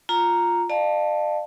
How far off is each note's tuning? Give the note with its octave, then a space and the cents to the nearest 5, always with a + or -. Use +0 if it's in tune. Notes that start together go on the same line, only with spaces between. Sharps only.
F4 +0 A#5 +0
D5 +45 F5 -5 A5 +0